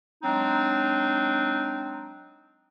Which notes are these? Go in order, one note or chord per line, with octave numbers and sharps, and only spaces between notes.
F#3 G#3 C4 D4 D#4